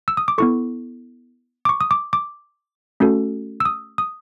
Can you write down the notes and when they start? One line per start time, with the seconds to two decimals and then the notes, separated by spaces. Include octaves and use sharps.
0.08 E6
0.17 D#6
0.28 D6
0.38 B3 E4 A4 C#6
1.65 D6
1.69 C#6
1.81 D#6
1.91 D6
2.13 D6
3.00 A3 C#4 F#4 A4
3.60 E6
3.65 D#6
3.98 D#6